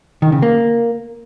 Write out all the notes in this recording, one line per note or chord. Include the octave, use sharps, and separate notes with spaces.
D#3
C#3
A#3